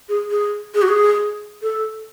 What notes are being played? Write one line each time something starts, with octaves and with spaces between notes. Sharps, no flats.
G#4
G#4
G#4
F#4
G#4
A4